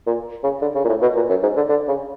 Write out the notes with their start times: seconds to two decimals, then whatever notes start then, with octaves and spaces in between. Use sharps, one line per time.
0.07 A#2
0.44 C#3
0.62 D3
0.75 C#3
0.84 A#2
0.89 A2
1.02 B2
1.16 A#2
1.30 F#2
1.42 G#2
1.57 D3
1.69 D3
1.88 C#3